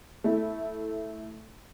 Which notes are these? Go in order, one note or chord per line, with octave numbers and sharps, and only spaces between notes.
A3 E4